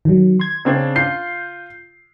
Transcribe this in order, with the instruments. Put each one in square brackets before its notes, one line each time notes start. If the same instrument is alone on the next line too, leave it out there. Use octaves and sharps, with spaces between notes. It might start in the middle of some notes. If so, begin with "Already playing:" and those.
[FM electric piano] D#3 F#3
C6 G#6
[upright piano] C#3 C4 D4
[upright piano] F4 C7 [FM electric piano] G6